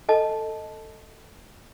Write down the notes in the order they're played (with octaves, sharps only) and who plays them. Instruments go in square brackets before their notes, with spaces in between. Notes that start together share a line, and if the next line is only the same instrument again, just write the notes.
[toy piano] A4 D#5 A5